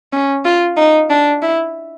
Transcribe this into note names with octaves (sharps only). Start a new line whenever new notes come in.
C#4
F4
D#4
D4
E4